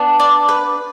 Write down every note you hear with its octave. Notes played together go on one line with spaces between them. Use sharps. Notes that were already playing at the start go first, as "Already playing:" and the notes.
Already playing: B3 D4
D5
B4